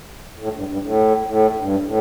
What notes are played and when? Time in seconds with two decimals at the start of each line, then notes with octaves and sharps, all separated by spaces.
0.39 A2
0.53 G2
0.68 G2
0.82 A2
1.26 A2
1.55 G2
1.85 A2